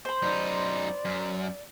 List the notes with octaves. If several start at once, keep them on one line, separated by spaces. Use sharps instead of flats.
C5 B5
F#2 D#4 D5
F#2